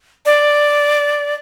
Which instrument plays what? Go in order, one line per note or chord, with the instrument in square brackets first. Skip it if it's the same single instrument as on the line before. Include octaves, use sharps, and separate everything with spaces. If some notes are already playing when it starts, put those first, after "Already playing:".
[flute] D5